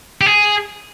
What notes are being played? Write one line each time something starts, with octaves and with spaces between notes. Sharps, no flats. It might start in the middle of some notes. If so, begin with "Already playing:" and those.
G4
G#4